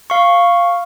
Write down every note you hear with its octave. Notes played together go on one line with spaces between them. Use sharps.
F5 C#6